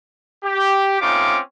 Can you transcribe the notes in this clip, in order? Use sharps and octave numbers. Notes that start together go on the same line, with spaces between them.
G4
A3 C4 C#4 D#4 F4 D6